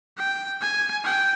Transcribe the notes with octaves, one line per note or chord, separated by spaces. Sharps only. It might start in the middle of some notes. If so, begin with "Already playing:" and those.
G5
G#5
G5